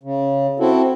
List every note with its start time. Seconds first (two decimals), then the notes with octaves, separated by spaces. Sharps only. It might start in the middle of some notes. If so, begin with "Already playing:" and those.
0.03 C#3
0.60 C4 E4 F#4 A4